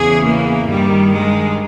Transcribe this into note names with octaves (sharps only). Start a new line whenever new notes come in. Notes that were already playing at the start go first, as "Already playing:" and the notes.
Already playing: E2 C#3 E3 G#4
A#3
G2 D#3 G3
G#3